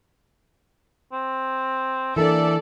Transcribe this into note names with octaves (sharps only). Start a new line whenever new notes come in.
C4
E3 A#3 D4 A4 D5 E5